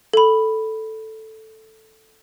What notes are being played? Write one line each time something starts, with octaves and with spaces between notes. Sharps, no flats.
A4 B5